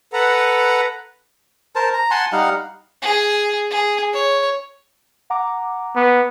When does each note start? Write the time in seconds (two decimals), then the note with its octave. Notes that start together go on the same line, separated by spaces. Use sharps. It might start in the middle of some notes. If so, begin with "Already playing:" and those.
0.13 A4 B4 F#5 A#5
1.75 A#4 C5 A5
1.93 A#5
2.11 F#5 G#5 A5 C6
2.32 G3 D#4 F5 F#5
3.02 G#4
3.71 G#4
4.14 C#5
5.30 F#5 A#5 D6
5.96 B3